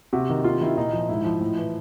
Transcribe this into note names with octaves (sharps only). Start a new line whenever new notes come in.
C3 F#4
D#3
C3 F4
D#3 E4
A#2 D#4
F3
G#2 E4
F3
A2
E3